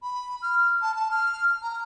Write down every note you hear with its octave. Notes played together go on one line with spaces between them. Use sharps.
B5
F6
A5
A5
F6
A#5